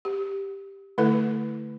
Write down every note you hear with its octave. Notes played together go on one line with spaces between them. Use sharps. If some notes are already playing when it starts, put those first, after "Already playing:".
G4
D3 A3 E4 A4 B4